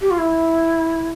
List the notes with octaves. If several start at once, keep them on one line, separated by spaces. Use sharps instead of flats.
G4
F4
E4